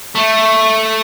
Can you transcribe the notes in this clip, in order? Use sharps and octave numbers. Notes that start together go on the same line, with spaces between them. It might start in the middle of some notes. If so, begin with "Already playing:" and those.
A3